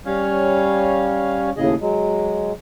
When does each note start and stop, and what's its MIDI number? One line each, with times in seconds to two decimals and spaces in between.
0.06 1.50 55
0.06 1.50 61
0.06 1.50 73
0.06 1.50 77
1.57 1.75 39
1.57 1.75 45
1.57 1.75 49
1.57 1.75 68
1.57 1.75 75
1.81 2.52 54
1.81 2.52 56